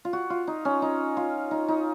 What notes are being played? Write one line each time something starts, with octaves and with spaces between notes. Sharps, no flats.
F4
F#4
F4
D#4
C#4
D#4
F4
D#4
D#4